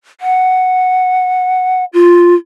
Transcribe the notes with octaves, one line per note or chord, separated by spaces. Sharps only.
F#5
F4